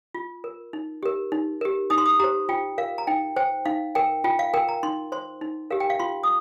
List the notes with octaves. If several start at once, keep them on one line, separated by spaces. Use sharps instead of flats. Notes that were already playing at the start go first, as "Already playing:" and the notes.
F4
A#4
D#4
G4 A#4
D#4
G4 A#4
D#4 D#6
C6
D#6
G4 C5 A#5
F4 G5
A#4 F5
A#5
D#4 G5
C5 G5
D#4 F5
A#4 G5
F4 G5
F5
A#4 G5
A#5
D#4 C6
C5 C6
D#4
G4 A#4 F5
G5
F5
F4 C6
D#6